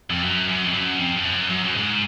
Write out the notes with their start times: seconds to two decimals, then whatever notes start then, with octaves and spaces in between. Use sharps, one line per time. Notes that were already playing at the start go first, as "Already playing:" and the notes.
0.10 F2
0.23 F#2
0.49 F#2
0.64 F2
0.74 F#2
0.99 F2
1.17 F2
1.25 F#2
1.50 F#2
1.64 F#2
1.76 G#2